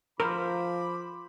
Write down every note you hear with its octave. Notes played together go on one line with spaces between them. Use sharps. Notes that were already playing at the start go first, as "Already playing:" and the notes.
F3 A#4 C5 B5 D6